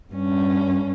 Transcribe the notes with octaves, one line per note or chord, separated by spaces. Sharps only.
G2 C#4